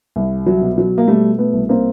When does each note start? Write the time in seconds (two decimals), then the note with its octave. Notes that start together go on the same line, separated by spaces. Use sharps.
0.16 C2
0.46 F#3
0.61 B2
0.78 F#3
0.98 A#3
1.08 B2 G3 A3
1.38 A3 B3
1.53 C2
1.69 A#3 C4